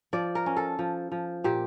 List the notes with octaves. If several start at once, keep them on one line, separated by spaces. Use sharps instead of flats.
F3 D5
A#4
C#4
A4
F3
F3
A#2 G4